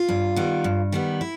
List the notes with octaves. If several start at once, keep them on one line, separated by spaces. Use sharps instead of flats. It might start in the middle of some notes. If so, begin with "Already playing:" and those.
Already playing: F4
G2
D#3 G3 B3
G2
D#3 G3 B3
E4